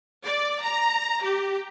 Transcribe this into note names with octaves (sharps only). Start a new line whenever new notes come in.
D5
A#5
G4